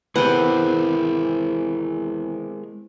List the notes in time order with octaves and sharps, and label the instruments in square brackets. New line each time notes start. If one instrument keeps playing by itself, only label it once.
[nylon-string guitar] E2 [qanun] C3 F#5 [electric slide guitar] G#3 G#4 A#4 [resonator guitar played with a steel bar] B4